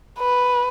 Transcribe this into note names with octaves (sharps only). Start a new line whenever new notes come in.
B4